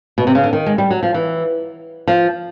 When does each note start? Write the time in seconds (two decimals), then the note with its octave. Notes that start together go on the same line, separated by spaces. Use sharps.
0.18 B2
0.27 C3
0.35 C#3
0.44 D3
0.53 D#3
0.66 G#3
0.78 G3
0.91 F#3
1.03 F3
1.14 E3
2.08 F3